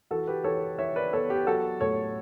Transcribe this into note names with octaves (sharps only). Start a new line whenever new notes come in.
E3 F#4 A4
G4 B4
E3 A4 C#5
E3 C#5 E5
B4 D5
B3 A4 C#5
G4
F#3 F#4 A4
A2 A4 C#5